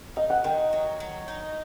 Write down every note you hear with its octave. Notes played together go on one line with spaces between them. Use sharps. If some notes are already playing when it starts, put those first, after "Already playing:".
D#4 D#5
F#5
D#3 G5
F#3
F#3
D#4